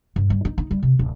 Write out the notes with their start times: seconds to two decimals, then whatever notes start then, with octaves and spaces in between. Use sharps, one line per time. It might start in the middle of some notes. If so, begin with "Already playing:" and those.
0.16 G2
0.30 G2
0.45 D#4
0.58 D#4
0.71 G3
0.83 C3
0.99 D1